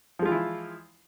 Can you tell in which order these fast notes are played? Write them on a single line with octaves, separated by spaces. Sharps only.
F3 G#3 F4 E3 E4